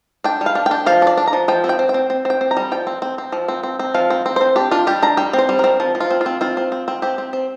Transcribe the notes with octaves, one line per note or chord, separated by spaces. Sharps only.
D4 G5
G3
F5
D4
G5
D4
F3 F5
D4 D5
D4
A#5
F3
F3 G5
C4
G5
C4
G5
C4
C4
C4 G5
C4
A#5
G3
F3 G5
C4
C4
C4
F3
C4
C4
C4
F3 F5
C4
C4
C4 C5
D4 G4
D4 F4
G3 G4
D4 A#5
G3 G5
C4
C5
G3
C4 A#4
F3
F3
F4
C4
F4
C4
C4 F4
C4
C4
C4
C4 G4
C4
C4